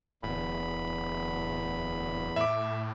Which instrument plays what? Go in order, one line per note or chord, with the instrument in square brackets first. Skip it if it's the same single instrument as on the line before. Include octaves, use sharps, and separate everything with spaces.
[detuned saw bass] D1 [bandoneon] E2 B5
[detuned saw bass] A2 [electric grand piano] E5 D6